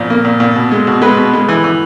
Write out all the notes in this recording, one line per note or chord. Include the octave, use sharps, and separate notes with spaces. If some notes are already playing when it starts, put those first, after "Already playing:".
Already playing: A#2 F3
A#3
A#2
A#2
B2
G#3
B2
G#3 B4
B2
G#3
E3
E3